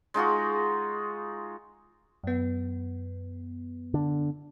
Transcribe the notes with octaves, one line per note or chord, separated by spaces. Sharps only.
G#3 D#4 F4 F#4
F#2 B3
D3